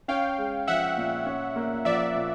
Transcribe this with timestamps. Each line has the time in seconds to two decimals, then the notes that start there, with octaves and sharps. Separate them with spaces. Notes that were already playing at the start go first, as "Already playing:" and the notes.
0.08 C#4 F5 G5
0.38 G#3
0.67 F3 E5 F#5
0.97 A#2
1.26 C#4
1.56 A#3
1.85 F3 D5 E5
2.15 A#2